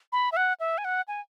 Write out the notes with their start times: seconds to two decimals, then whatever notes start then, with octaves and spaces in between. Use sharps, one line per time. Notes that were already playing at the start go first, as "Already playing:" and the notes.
0.12 B5
0.32 E5
0.37 F#5
0.60 E5
0.78 G#5
0.85 F#5
1.08 G#5